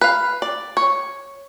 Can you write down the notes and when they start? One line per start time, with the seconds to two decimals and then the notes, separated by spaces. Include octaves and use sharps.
0.01 B4 F5
0.42 D5
0.77 C#5